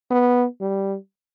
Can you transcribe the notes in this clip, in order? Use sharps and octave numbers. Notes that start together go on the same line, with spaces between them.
B3
G3